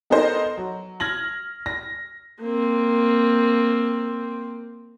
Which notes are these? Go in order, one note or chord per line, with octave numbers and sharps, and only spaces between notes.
B3 D#4 A4 A#4 C5 D#5
F#3
F6 G#6 A#6 F#7
A#6
A#3 C4